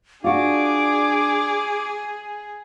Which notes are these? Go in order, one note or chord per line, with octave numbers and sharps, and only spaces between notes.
D4 F4 F#4 G#4 D6